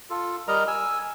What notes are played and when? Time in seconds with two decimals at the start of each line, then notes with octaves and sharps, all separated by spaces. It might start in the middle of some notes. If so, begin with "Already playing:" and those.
0.10 F4 A4
0.48 G3 A#4 D#5 A#5
0.68 G#5 E6